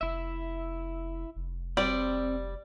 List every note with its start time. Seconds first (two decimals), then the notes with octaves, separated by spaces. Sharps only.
0.01 F1 E4 E5
1.36 F1
1.77 G3 C4 D5